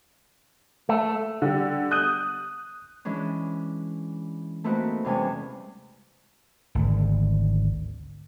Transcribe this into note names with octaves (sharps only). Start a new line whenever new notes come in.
A3
D3 G3
D#6 F#6 G6 D#7
E3 G#3 C#4 D4
A3 A#3 C4 D#4 F#4 B4
E2 C3 G3 G#3 C#4 G#5
G#1 D2